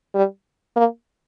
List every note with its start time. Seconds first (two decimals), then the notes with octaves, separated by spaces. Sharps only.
0.15 G3
0.76 A#3